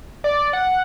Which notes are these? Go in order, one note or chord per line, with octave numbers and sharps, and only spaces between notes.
D5
F#5